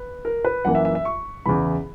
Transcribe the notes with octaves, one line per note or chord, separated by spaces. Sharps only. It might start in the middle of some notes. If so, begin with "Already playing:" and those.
Already playing: B4
A#4
B4
F#2 E3 A#3 F#5
E5
E5
E5
C#6
E2 C#3 E3 B5